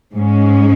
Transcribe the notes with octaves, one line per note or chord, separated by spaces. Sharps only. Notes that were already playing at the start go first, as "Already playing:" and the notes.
G#2 G#3 C#4